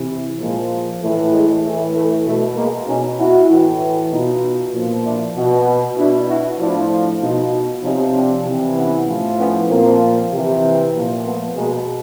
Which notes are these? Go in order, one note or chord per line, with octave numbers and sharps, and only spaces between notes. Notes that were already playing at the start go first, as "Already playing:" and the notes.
Already playing: C3 E3
A#2 F3 G#3 A#3
A2 E3 A3
G#3
A2 E3 A3
A3
B2 A3
G#3 A#3
B2 C#4 D#4
E4 F#4
A2 E3
B2 D#4 F4
A#2 F3
D4 E4
B2
B2 D4 E4
E4 F#4
A2 F3 D4 E4
B2 D#4 F4
C3 F3 C#4 D#4
C4 D4
C3 E3
B3 C#4
A2 F3
B3 C#4
A#2 F3 A#3 C4
C3 E3
A#2 F3
A3 B3
B2 G#3 A#3